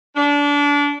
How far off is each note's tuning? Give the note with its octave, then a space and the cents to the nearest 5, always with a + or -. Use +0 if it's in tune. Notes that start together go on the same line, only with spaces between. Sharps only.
D4 -25